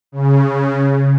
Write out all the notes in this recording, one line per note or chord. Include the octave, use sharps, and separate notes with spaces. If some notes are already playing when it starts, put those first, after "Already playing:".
C#3